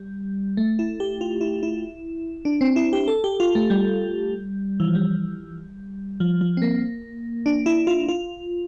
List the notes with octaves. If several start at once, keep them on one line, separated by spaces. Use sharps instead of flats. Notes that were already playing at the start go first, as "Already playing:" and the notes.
Already playing: G3
A3
E4
G4
F4
E4
E4
D4
C4
E4
G4
A4
G4
F4
A3
G3
E3
F3
G3
F3
F3
C4
A#3
D4
E4
F4
F4